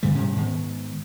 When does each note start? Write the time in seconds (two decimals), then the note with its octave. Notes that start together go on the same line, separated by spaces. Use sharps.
0.03 G2 D3 G#3 A3
0.15 G#2 C3 G3 C#4
0.36 G#2 D#3 G#3 B3